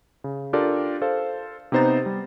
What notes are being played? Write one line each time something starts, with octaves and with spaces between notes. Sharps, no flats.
C#3
D4 F4 G4 A4 A#4 D5
A4 C5 F5
C3 B3 D#4 C5 A#5 A6
G3